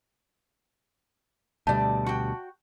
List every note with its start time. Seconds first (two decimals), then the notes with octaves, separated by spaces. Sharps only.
1.67 D2 B2 G3 A3 D5 A5
2.06 F#4 G5